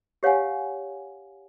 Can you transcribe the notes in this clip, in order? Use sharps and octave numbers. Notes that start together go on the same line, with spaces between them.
G4 C#5 F5 F#5 G#5